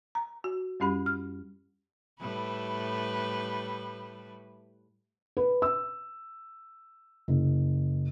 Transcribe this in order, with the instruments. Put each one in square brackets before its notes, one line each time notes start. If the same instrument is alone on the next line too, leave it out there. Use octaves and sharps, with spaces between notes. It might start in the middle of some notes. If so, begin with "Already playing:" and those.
[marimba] A#5
F#4
F#2 G3 C#4 G4 B5
F6
[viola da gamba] A2 G3 B4
[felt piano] B4
E6
F#1